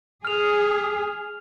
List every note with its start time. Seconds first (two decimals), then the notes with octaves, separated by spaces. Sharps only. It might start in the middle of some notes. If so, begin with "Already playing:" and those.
0.25 G#4 F6 F7